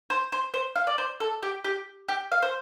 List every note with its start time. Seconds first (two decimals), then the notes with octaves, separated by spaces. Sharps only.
0.10 C5
0.32 C5
0.54 C5
0.76 F5
0.87 D5
0.98 C5
1.20 A4
1.43 G4
1.65 G4
2.09 G4
2.32 F5
2.42 C5